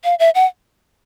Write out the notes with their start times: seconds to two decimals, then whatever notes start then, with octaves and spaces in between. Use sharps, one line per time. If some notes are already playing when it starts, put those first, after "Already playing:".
0.04 F5
0.19 E5
0.35 F#5